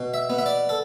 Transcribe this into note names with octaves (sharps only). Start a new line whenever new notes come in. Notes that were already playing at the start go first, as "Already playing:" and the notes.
Already playing: B2
E5
B3
E5
D5
A4